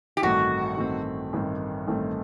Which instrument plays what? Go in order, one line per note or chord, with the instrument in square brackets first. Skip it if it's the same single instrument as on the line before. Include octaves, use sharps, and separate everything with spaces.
[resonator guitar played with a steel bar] G4
[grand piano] A1 G2 D#3 A3 C4 [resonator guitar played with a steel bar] F#4
[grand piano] A1 G2 D#3 A3 C4
A1 G2 D#3 A3 C4
A1 G2 D#3 A3 C4